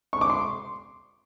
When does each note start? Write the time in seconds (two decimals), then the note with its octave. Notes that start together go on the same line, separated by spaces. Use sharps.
0.13 C#6
0.21 D6
0.30 C6